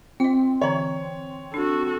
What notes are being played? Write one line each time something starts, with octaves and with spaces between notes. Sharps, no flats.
C4 F4 D#5
D3 E3 C#5 A#5
D4 F#4 A4